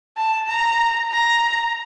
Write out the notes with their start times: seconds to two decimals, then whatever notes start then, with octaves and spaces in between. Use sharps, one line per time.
0.17 A5
0.48 A#5
1.12 A#5